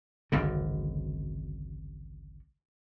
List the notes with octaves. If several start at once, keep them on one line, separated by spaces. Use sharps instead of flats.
G#1 C#2 F#2 D3